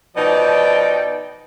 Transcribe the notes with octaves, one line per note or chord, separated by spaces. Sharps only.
B2 F3 D#4 D5 G5